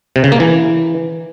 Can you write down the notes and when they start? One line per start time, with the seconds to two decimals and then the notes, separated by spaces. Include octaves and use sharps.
0.16 C3
0.24 C#3
0.32 A#3
0.40 E3